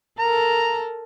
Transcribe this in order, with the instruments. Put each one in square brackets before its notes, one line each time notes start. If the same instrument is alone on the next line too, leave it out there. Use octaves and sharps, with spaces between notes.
[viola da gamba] A4 A#4 [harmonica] A#5